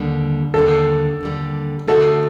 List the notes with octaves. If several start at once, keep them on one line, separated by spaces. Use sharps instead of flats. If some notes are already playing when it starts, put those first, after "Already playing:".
Already playing: D#2 D3 G3
D#2 D3 G3 A4
D#2 D3 G3
D3 A3 D#4 F#4 A4